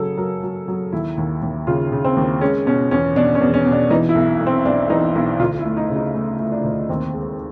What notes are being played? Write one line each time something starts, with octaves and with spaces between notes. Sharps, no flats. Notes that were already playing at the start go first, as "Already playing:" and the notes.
Already playing: F#1 C#3 F#3 G#4 A4
F#3 A#4
F#3
F#3
D#2 E4
D#2
D#2
C#3 F4
C#3
C4
D#2
G#3 C#4
B2 C#4
E2 C#4
B2 D4
C#4
E2
C#4
B2
D4
E3 D#4
E4
B1
B1
C4
B1 D4
E3 D#4
B1 E4
D2 F4
E4
A3
D#4
C#3
D#4
A3
A3
D4
D2
D#2 C4
G#3